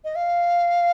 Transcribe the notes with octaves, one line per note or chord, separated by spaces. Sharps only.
D#5
F5